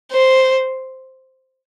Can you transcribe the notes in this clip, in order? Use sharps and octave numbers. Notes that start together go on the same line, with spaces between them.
C5